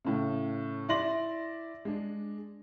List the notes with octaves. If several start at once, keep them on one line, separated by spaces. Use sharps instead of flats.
A2 C#3
E4 D5 E5 C6 A#6 F#7
G#3 D4